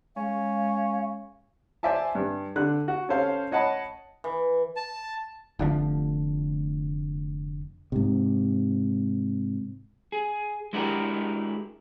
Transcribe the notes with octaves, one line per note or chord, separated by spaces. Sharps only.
G#3 C#4 F5
C5 D5 E5 G#5 A5
G2
D3 F#6
F#4
C#4 A4 C5 F5
C#5 D#5 F#5 A5 B5
E3
A5
F1 D3 F3 A3
G#2 C3
G#4
G#3 D4 E4 F#4 G4 A#4